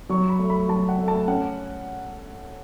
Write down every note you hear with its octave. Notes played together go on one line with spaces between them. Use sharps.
F#3 C#6
B5
A3
B5
F#3 A5
F#5
A3
A5
C#4 F#5